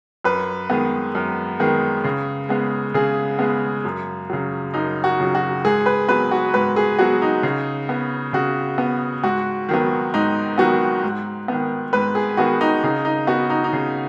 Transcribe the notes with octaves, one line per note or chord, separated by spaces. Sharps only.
F#2 B4
D#3 G#3 B3
F#2
D#3 G#3 B3
C#3
G#3 B3
C#3 G#4
G#3 B3
F#2
C#3 F#3
F#2 D#4
F#4
C#3 F#3
F#4
G#2 G#4
B4
F#3 B3 B4
F#4
G#2 B4
G#4
F#3 B3 F#4
D#4
C#3
B3
C#3 F#4
B3
G#2 F#4
D#3 F#3 B3
G#2 D#4
D#3 F#3 B3 F#4
G#2
D#3 B3
G#2 B4
G#4
D#3 B3 F#4
D#4
C#3 D#4
D#4
B3 F#4
D#4
D#4
C#3